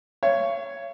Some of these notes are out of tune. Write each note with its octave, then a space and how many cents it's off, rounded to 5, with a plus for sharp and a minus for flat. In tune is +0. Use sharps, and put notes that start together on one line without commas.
C#5 +0 F5 -45